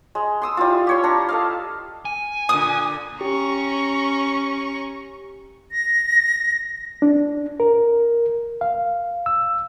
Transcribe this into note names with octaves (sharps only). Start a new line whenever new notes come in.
G#3
C6 D#6 E6
G3 E4 F4
G4 C#5 C6
D4 A#5
A4 D#5 F5
G#5
A#2 D3 D#6
C#4 G4 A#5 C#6
A#6
D4
A#4
F5
E6